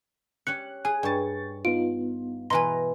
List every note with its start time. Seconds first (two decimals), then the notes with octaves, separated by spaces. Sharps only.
0.47 C#4 G4 C#5 F#6 C#7
0.85 G#4 G#5
1.03 G2 G5 A5 C#6 A6
1.65 B3 D#4 F4 D7
2.50 B2 E3 B4 G#5 A#5 C6